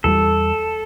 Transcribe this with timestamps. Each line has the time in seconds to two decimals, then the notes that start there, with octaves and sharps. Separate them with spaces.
0.04 E2 E3 G3 A4